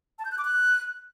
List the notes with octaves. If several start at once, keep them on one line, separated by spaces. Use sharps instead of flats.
A5
G6
F#6
D6
F#6